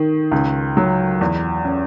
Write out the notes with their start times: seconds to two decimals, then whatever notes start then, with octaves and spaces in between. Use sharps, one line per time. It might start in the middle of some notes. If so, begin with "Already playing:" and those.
Already playing: D#3
0.31 C#2
0.77 F#3
1.21 E2
1.65 C#4